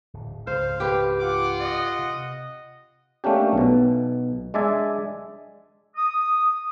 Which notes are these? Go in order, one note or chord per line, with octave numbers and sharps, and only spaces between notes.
D1
C#2 G#2 C5 F5
G4 B4
F4 F#5 D6
D#5
C3
A3 A#3 C#4 D4 G4
B1 B2
G#3 D4 D5 E5 G#5
D#6